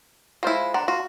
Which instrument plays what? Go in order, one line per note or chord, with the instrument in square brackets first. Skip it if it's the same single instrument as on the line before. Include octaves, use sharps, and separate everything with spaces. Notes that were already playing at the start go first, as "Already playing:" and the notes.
[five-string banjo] G#3 E4 [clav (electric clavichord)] F4 C5
[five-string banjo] D4 [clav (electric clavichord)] C5 F#5 A#5
[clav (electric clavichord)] F4 [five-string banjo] F#4